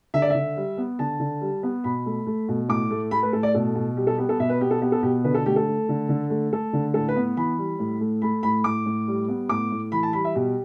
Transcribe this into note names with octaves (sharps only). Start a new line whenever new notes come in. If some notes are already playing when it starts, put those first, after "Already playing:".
D3 E5
D5
D3 E5
G3
B3
D3 A5
D3
G3
B3
B2 B5
A3
A3
B2
A2 D6
A3
A3 B5
B4
A2 A4
D5
B2 A4
B2
G3 G4
A4
B3 G4
A4
B2 E5
B4
B3 G4
A4
B3 G4
A4
B2 G4
D3 B4
A4
A3 G4
A4
A3
D3
D3
A3
A3 A4
D3
A2 A4
B4
B3
E3 B5
G3
A2
A3
A3 B5
A2 B5
A2 D6
A2
G3
B3
A2 D6
A2
E3 B5
A5
G3 B5
E5
B2 G4